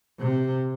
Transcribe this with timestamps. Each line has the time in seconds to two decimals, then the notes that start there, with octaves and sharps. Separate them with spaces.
0.18 C3